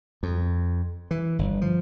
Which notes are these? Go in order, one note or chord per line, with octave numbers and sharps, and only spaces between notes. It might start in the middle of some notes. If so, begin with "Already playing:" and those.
F2
E3
G1
F3